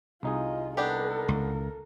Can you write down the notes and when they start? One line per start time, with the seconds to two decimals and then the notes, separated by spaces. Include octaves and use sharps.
0.23 C2 D#4 F4 G#4 D#5
0.77 B3 D4 G4 A4 A#4
1.28 C#2